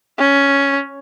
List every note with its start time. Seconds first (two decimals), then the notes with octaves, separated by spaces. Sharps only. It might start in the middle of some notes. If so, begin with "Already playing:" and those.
0.19 C#4